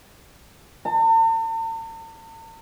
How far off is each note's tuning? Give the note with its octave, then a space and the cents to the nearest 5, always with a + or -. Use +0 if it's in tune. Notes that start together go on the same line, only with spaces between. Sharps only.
A5 +45